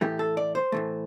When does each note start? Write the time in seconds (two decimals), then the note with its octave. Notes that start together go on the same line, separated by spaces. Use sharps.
0.01 A2 E3 A3 G4
0.19 A4
0.37 D5
0.55 C5
0.72 A2 E3 A3